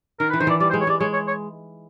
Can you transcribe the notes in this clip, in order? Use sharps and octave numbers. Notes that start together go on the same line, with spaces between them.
D#3 A#4
B4
E3
D#3 C5
E3 D5
G3 D5
C5
G#3
C#5
G#3 D5
G#3 C#5
C#5
C#5